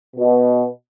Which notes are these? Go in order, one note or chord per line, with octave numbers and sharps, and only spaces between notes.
B2